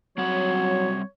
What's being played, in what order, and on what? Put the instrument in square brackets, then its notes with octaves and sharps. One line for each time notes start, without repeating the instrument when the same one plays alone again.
[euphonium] F#3 [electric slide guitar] G3 C4 F#5 [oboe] C#5